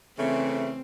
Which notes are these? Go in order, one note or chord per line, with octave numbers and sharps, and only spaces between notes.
C#3 E3 A3 C4